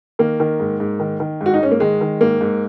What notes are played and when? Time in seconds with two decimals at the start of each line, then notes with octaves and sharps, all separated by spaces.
0.19 D#3 A#3
0.40 D#3
0.60 G#2
0.80 G#2
1.00 D#3
1.20 D#3
1.41 G#2
1.46 F#4
1.54 D#4
1.61 G#2 C#4
1.71 A#3
1.80 D#3 G#3
2.01 D#3
2.21 G#2 A#3
2.41 G#2